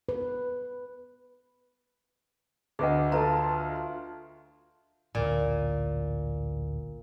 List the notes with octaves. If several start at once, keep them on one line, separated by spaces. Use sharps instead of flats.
B4
D2 G#4 B4 D#5 F#5
F4 A4 B4 A5 A#5
A1 D2 A#2